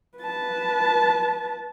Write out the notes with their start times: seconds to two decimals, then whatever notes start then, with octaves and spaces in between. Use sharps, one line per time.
0.18 B4 A5